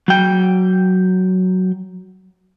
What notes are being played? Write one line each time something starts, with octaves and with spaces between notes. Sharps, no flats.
F#3 G5